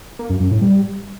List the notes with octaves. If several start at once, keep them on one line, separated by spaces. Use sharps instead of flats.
A#3
F#2
F#2
A2
G3